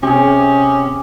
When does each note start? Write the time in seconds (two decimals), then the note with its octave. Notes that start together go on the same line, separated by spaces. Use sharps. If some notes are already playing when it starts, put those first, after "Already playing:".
0.03 C3 C#4 G4 G#4